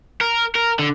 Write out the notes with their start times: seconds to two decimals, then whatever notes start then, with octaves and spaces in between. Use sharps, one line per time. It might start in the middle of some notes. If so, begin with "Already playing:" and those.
0.21 A#4
0.55 A#4
0.79 D3